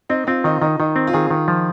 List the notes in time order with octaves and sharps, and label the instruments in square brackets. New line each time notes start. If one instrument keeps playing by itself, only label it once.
[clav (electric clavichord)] C4 [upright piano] D#4
[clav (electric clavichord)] C4 [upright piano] F4
[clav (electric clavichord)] D#3 [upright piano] D#4
[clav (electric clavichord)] D#3 [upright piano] D#4
[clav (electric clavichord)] D#3 [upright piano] D#4
[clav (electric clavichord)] C4
[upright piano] F4
[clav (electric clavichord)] D#3 [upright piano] G#4
[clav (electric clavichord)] D#3
F3